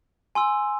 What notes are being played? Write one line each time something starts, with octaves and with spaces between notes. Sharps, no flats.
G#5 C6 E6